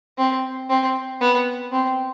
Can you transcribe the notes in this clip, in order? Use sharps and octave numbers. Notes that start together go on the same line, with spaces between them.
C4
C4
B3
C4